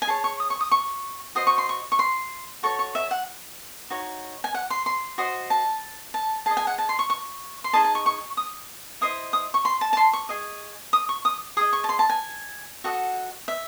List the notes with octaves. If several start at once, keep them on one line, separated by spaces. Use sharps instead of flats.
G#5
G#4 C#5 A5
C#6
D#6
C#6
D#6
C#6
F#4 C5 D#5 D#6
C#6
C6
C#6
C#6
C6
F#4 A4 C#5 C#6
C#6
E5
F#5
D#4 F#4 C#5
G#5
F#5
C6
C6
F#4 C5 D#5
A5
A5
G#4 D#5 A5
G#5
F#5
A5
C6
C#6
C#6
C6
D#4 G#4 D#5 A5
A5
C#6
C#6
D#6
E4 C5 D#5 D#6
D#6
C#6
C6
A5
A5
C6
C#6
G#4 D#5
D#6
C#6
D#6
G#4 D#5 D#6
C#6
A5
C6
A5
G#5
F#4 A4 D#5 F#5
E5